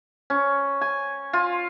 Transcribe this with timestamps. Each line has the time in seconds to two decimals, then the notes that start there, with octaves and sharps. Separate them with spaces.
0.30 C#4
0.81 G#5
1.33 F4